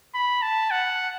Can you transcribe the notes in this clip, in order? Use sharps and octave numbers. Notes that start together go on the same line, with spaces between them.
B5
A5
F#5